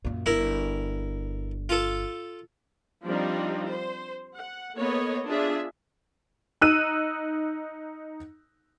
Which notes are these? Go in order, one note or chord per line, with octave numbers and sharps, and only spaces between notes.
F#2 A#2
G1 E4 A#4
F4 A4
F3 G3 C4 D4 D#4
C5
F#5
A#3 B3 A4 C#5 D#5
D4 F4 G#4 E5
D#4 E6 F#6 D#7